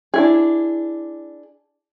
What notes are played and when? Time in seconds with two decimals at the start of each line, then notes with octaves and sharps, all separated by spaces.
0.14 D4 E4 G#4